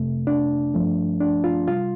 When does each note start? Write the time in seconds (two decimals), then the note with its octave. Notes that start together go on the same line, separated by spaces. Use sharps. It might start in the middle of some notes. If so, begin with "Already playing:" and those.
Already playing: F2 C3 A3
0.27 D4
0.74 G2 F3 A3
1.21 D4
1.44 F4
1.67 C3 G3 F4